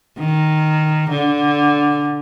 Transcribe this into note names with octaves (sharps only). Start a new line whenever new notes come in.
D#3
D3